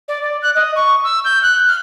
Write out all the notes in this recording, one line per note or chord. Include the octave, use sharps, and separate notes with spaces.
D5
D5
F#6
D#5
C#6
E6
G6
F#6
F6